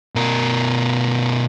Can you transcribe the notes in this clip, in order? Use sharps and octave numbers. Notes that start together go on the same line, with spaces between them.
B2 A#4